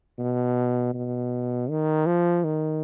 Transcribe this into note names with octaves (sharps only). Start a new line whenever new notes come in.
B2
B2
D#3
F3
D#3